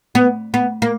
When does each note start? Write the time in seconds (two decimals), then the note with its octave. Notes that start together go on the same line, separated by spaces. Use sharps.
0.15 B3
0.54 B3
0.82 A#3